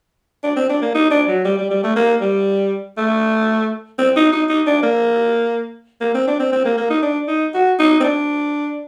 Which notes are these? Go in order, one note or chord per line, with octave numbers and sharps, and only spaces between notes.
D4
C4
D4
A#3
D#4
D4
F#3
G3
G3
G3
A3
A#3
G3
A3
C4
D#4
D#4
D#4
D4
A#3
A#3
C4
D4
C4
C4
A#3
A#3
D#4
D4
D#4
F#4
D#4
C4
D4